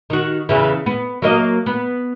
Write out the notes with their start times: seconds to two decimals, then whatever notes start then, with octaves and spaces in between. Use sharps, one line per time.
0.10 D#3 F#4
0.49 E2 C#3 E3
0.86 B3
1.22 F#3 A#3 D#5
1.66 B3